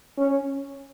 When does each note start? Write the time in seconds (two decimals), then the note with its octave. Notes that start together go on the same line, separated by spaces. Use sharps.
0.18 C#4